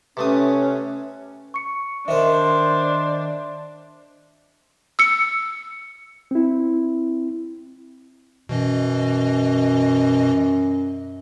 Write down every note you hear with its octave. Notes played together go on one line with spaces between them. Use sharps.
C3 A3 C#4 B4 D#6
C#6 C#7
D#3 D4 A#4 C5 E5
E6 C#7
C4 E4
F#2 B2 E3 D#5